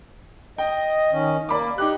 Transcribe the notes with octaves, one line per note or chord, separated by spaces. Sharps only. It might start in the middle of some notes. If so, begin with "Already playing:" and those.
D#5 G5
D#3 C#4
A#3 D5 B5 D6
D#4 G4 F#6